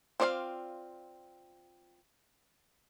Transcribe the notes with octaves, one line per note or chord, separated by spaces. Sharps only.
C4 F4 D5 D#5 F5